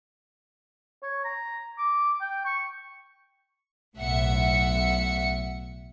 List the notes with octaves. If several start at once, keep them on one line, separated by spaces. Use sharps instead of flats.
C#5
A#5
D6
G5
C#6
B1 A2 E5 F#5 C#7